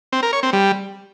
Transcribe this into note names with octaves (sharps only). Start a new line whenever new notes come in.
C4
A#4
C#5
C4
G3